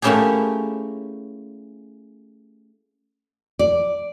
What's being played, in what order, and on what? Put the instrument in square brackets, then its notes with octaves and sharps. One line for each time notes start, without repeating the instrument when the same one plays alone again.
[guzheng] A3 A#3 C#4 E4 G4 G#4
[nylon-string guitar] D5